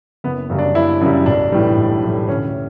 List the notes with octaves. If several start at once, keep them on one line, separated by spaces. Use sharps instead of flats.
F#1 B3
F#2 C#3 G3
D4
F#1 E4
F#2 C#3 G3
B1 D4
A2 E3 G3
B1
A2 E3 G3
D2 C#4